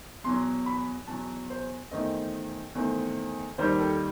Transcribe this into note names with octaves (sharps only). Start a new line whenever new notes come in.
E2 B2 F#3 C6
B5
E2 B2 F#3 A5
C5
E2 D#3 A3 C4 D#5
E2 D#3 A3 C4
D#2 D#3 G3 C5
A4